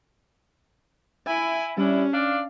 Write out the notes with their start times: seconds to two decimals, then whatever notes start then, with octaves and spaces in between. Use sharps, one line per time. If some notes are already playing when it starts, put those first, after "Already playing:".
1.27 E4 G#5
1.77 G3 C#4 D4 E4
2.13 D4 D5 F5